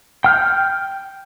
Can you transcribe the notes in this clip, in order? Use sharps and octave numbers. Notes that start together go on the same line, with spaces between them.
G5 F6 G6